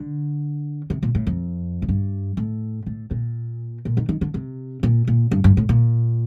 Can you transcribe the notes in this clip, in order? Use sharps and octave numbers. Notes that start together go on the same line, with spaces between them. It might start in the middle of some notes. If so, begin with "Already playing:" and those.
Already playing: D3
C3
A#2
A2
F2
A2
G2
A2
A2
A#2
A#2
D#3
D#3
D3
C3
A#2
A#2
G2
G2
A2
A#2